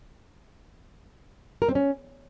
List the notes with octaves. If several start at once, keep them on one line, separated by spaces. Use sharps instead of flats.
A#4
C4
C#4